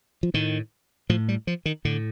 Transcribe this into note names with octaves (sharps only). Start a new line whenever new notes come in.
F3
A2 D#3
A2 F3
G3
F3
D#3
A2 D3